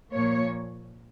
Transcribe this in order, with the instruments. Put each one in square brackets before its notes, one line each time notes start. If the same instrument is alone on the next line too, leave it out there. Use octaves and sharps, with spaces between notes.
[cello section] A#2 F3 A#3 C#5